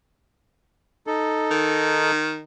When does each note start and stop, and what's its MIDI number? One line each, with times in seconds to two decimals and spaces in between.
1.07 2.11 63
1.07 2.11 69
1.51 2.43 51